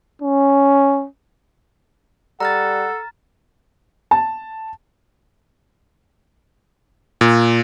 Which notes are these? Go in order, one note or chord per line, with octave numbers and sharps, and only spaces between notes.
C#4
G3 A4 F#5 A#5 F6 A6
A5
A#2